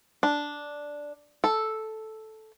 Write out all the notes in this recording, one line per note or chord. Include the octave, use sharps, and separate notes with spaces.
D4
A4